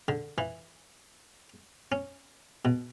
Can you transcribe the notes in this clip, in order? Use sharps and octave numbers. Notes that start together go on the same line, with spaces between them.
D3
E3
C#4
B2